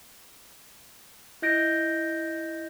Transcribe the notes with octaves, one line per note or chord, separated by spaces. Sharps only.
E4 D#5 G6 A#6 D7